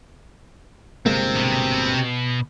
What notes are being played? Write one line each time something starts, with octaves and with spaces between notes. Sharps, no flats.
G1 C3 G#3 A#3 C4
B2